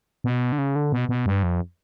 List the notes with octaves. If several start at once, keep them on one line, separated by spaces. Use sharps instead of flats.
B2
D3
C#3
D3
B2
B2
G2
F2